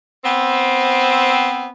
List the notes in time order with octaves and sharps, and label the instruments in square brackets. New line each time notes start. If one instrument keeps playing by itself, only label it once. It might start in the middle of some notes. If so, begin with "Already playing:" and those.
[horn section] B3 C4